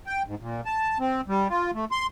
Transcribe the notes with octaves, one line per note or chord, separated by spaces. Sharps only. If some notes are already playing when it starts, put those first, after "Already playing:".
G5
G#2
A#2
A5
C4
G3
F4
A3
C6